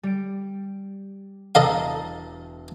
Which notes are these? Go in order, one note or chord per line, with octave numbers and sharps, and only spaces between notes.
G3 D7
E1 A4 D#5 F5 A5 A#5